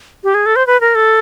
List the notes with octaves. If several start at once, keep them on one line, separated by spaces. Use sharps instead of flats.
G4
G#4
A4
C5
B4
A#4
A4